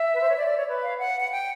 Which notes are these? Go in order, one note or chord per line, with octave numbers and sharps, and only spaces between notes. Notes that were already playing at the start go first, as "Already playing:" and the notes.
Already playing: E5
B4
C5
C#5
D5
D5
C#5
B4
F5
F#5
F#5
G5